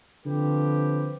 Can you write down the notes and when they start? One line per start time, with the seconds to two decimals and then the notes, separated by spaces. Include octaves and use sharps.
0.24 D3 F3 C4 G4 B4